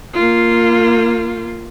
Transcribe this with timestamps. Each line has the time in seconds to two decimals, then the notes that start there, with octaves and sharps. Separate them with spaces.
0.14 A#3 F4